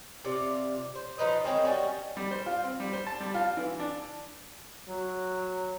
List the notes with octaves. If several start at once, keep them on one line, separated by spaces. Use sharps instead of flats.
C3 F4 D5
C5
F3 D#4 B4 D#5
D#3 G#3 C4 C#4
G3 C#4 F#4
G3
C5
F4
C4
G3
C5
A5
G3
F4
E3
D4
F#3